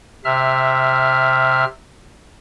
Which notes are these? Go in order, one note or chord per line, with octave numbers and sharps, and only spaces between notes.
C3 E5 F6